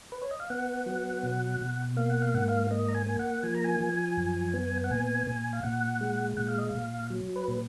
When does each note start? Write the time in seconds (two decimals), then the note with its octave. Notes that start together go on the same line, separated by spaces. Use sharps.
0.12 B4
0.22 C#5
0.31 D#5
0.40 F5
0.50 B3 F#5
0.86 F#3
1.23 B2
1.61 B2
1.96 A#3 F5
2.10 F#5
2.22 F5
2.34 G#2 F#5
2.48 F5
2.71 A#3 D#5
2.88 A#5
2.95 G#5
3.06 A#3
3.19 F#5
3.43 F3 G#5
3.55 A#5
3.64 G#5
3.81 F3
4.17 F#2
4.54 B3
4.84 F#5
4.91 A#2 G#5
5.27 A#2
5.53 F5
5.63 A#2 F#5
6.01 G#3
6.37 A#2 F#5
6.48 F5
6.58 D#5
6.69 F5
6.75 A#2
7.10 F#3
7.36 B4
7.48 A#2